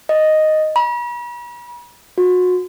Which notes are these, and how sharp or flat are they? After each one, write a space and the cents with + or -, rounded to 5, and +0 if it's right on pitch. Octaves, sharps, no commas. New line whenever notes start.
D#5 +0
B5 -45
F#4 -30